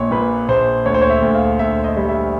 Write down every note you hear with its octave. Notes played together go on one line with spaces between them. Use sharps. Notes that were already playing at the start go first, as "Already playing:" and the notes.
Already playing: A#1 A#2 C#5
A#2 B4
A#1 C5
D2 C#5
C5
C#5
E5
D2
F5
D2 E5
D#5
G3
E5